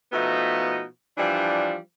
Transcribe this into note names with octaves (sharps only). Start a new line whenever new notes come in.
B2 F3 A3 B3 D#4
E3 F3 G3 D4